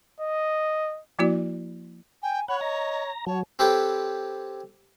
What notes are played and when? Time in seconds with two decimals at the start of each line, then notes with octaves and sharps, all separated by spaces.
0.20 D#5
1.19 F3 A#3 E4 F#4 D5
2.23 G5 G#5
2.48 C#5 F#5 B5
2.61 D#5 A#5
3.27 F#3 C#5 A5
3.59 C4 G4 A4 B4 C#5 G5